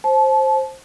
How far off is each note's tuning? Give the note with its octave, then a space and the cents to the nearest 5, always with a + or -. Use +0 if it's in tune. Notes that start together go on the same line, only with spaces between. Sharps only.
C5 +15 A5 -30